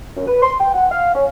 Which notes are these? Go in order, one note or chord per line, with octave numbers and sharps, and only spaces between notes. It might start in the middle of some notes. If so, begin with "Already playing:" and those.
F#2
B4
C6
G5
F#5
F5
C#4